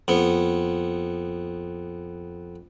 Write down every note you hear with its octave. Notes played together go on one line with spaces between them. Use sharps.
F2 B3